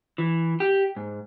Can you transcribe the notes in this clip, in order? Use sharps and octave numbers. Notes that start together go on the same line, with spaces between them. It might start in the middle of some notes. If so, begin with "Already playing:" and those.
E3
G4
G#2